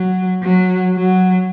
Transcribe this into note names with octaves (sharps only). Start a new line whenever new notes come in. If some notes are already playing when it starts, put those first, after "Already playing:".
Already playing: F#3
F#3
F#3